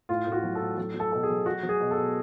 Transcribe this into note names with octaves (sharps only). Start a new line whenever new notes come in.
A2 F4
A2
F#4
F#3
A4
A2
F#3 A4
F#3
A4
B2 A4
G#4
F#3
F#3 F#4
F#3
G#4
B2
A4
B2